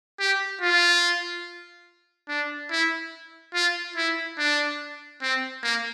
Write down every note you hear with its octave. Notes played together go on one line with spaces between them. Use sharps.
G4
F4
D4
E4
F4
E4
D4
C4
A#3